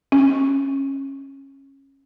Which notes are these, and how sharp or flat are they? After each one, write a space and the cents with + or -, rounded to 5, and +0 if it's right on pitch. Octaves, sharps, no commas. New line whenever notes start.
C#4 -20